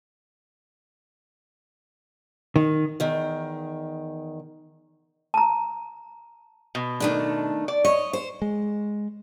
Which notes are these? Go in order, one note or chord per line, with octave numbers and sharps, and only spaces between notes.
D#3
E2 D#3
A5 A#5
B2
D#3 A3 D4
D5
C#5 D#5
C5
G#3